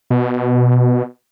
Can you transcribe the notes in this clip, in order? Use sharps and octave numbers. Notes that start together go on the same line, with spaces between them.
B2